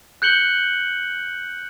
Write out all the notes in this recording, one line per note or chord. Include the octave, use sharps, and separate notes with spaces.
F#6 G6 C#7 F#7 G7